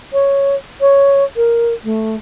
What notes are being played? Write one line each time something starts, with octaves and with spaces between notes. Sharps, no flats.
C#5
C#5
A#4
A3